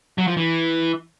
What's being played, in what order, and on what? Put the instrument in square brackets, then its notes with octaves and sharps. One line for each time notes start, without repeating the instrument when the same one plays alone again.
[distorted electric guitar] F#3
F3
E3